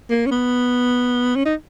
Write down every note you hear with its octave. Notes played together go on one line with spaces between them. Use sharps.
A#3
C#4
B3
C#4
D#4